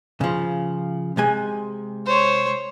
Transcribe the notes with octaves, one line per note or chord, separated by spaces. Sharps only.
C#3 F3
C3 G#3 G#5
C5 C#5